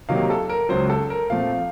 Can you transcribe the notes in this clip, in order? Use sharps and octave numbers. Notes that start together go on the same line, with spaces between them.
C3 D#3 F#3 A#3 F5
A4
A#4
C#2 C#3 F#3 C5
A4
A#4
A#2 F3 A3 C4 F5